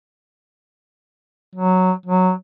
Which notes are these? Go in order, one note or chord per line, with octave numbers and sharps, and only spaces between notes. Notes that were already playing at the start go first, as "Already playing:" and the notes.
F#3
F#3